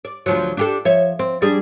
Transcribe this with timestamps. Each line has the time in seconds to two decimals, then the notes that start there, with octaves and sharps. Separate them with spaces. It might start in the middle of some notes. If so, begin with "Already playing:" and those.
0.05 D5
0.26 D2 F3 F#3
0.57 D4 G4 A4
0.85 F3 C#5 E5
1.19 C4
1.42 G3 D4 G#4